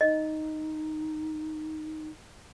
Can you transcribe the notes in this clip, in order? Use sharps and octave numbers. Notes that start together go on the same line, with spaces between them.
D#4 D#5